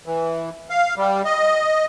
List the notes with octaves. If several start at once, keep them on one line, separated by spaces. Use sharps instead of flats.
E3
F5
G3
D#5